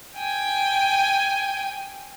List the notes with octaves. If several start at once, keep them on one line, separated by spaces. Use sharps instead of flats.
G5 G#5